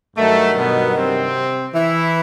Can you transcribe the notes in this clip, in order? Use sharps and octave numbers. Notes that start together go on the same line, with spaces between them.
G2 D#3 F#3 A3
B2 B3
C3 C4
E3 E4